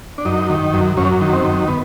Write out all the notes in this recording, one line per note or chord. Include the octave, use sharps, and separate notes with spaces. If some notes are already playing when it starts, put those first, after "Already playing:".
D4
F#2 D#4
D#3
F#2
F#2 C#4
D#3
C4
F#2
B3